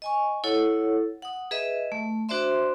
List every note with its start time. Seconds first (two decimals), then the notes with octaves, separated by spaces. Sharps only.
0.02 D#5 G#5 C#6
0.44 E4 A4 C#5 F#5
1.22 F#5 D#6
1.51 G#4 B4 D#5 E5
1.92 A3
2.29 D4 F#4 C5 D5 E5 C6